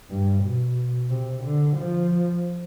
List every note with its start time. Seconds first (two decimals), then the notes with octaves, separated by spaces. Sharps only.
0.10 G2
0.44 B2
1.10 C3
1.44 D3
1.77 F3